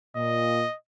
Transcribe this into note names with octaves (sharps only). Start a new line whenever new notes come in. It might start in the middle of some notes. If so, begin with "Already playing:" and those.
A#2 D#5